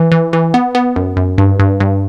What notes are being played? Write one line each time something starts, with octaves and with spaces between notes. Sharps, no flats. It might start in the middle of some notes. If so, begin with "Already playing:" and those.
Already playing: E3
E3
E3
B3
B3
F#2
F#2
G2
G2
G2